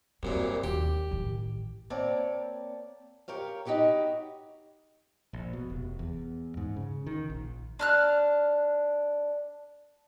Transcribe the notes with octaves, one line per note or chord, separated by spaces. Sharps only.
C2 F#2 A#2 G3
D#2 G4
A1 D#3
A#3 C4 C#5 D5 A5
G4 A#4 C#5 F5
D#4 F#4 G4 B4 C#5
A#1
B2
F1
E2
G#2
C#3
D#3
A#1
D4 F6 F#6